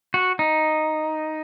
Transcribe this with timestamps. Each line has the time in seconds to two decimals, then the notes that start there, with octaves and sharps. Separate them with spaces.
0.14 F#4
0.39 D#4